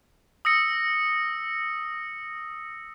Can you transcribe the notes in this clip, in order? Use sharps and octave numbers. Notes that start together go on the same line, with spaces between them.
D#6 E6 A#6 C#7